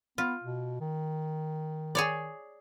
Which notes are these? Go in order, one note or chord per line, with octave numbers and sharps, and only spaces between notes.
B3 F4
B2
D#3
G#4 C#5 D5